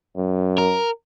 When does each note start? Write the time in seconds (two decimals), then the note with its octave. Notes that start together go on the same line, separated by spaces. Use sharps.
0.17 F#2
0.58 A#4